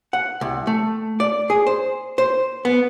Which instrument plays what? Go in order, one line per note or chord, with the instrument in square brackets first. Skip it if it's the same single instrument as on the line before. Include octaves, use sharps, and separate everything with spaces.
[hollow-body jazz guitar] F#5
C2
A3
D5
G#4
C5
C5
B3